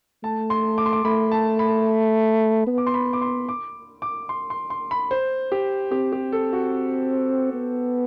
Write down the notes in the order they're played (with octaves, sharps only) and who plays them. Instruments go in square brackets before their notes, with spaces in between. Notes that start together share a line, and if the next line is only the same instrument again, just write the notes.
[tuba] A3 [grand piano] A5
[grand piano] C6
D6
C6
D6
[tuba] A3 [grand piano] B5
[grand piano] A5
B5
[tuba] B3
[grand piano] D6
C6
B5
D6
C6
D6
D6
C6
C6
C6
B5
C5
G4
[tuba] C4 [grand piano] G4
[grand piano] G4
A4
F#4
[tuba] B3